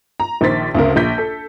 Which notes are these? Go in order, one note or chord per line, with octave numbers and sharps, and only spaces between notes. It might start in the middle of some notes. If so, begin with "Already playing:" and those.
A#5
A#1 D#3 C5 A6 B6
D2 C#3 A#4
A#1 G6 B6
A4